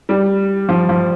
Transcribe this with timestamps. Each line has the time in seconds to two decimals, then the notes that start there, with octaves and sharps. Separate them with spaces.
0.09 G3
0.69 F3
0.89 F3